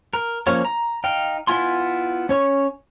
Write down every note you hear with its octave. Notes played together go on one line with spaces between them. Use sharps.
A#4
F3 A#3 C#4 C#5
A#5
D#4 F5 G5
B3 E4 F4 G#5 C6
C#4 C#5 C#6